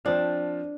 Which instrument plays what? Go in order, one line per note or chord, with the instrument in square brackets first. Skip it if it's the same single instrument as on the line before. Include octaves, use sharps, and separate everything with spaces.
[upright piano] F3 C4 F4 [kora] D4